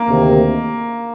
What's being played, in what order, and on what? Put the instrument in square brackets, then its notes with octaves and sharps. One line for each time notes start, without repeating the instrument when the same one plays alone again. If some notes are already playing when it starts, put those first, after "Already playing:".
Already playing: [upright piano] A#3
[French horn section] D2 C3 D#3